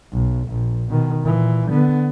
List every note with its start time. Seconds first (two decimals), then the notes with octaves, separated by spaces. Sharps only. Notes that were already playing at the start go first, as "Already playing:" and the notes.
0.12 B1
0.48 A#1
0.90 B2 D#3
1.23 A#2 E3
1.69 D3 B3